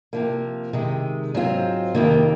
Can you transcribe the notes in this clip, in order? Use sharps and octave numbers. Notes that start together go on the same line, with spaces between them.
C3 F3 A#3
C3 D#3 G#3
G#2 F#3 C4 F4
F2 C3 D#3 A#3